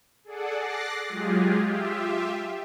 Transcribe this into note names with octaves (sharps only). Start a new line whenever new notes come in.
G#4 A4 D5 F#5
D6 F#6 A6 A#6 C7
F#3 G#3 F4 G4 G#4
F4 G4 E5